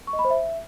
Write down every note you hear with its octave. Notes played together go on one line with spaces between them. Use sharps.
C#6
D#5
B5
C5
E5